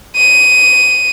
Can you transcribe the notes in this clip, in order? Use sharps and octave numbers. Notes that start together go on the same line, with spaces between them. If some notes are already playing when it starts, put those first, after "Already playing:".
D#7